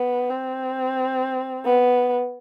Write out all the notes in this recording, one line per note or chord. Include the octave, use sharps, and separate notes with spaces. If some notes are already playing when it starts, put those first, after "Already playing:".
Already playing: B3
C4
B3